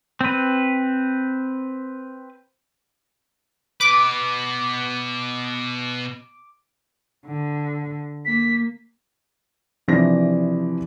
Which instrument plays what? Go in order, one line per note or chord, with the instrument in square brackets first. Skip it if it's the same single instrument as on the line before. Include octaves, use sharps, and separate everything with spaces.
[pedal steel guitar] C4 B4
[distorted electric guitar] B2 B4 [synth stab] D6
[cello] D3
[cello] A#3 [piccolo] B6
[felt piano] C3 E3 F3 D4 D5 A#6